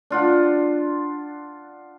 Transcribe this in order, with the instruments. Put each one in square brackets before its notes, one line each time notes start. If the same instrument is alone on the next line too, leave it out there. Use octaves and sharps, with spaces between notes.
[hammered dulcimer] D4 F4 F#5